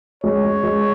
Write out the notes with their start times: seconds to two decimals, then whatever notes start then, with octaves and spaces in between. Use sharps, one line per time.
0.24 G#3 C#5
0.44 G#3
0.64 G#3